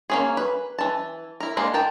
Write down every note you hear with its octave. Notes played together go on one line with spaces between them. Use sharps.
A#3 C#4 G#4
B4
E3 A5
E4 A#4
G#3 A#3 D4
A#4 G5 A5